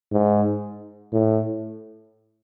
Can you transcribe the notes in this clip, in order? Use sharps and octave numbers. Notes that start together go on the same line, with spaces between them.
G#2
A2